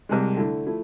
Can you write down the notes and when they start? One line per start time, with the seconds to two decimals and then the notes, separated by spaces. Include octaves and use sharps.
0.09 C2 C3 G#3
0.37 D3 A3 E4
0.66 F3 A3 E4